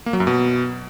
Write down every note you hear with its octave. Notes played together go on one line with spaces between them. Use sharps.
A#3
F#3
F#2
B2